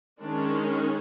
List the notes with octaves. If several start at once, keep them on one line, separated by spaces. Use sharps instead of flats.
D#3 G#3 C#4 D4